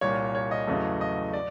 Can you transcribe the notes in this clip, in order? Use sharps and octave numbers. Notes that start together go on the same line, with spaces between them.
C2 A#2 G3 C#5
C#5
D#5
E2 C#3 F#3 A3
D#5
D5